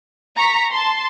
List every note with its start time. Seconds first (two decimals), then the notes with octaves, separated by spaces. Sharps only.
0.36 A#5 C#6 B6
0.71 A5 C6